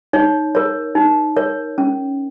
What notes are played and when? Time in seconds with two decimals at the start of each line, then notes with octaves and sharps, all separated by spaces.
0.13 D#4 C#5
0.55 A#4 C#5
0.95 D#4
1.36 A#4 C#5
1.78 C#4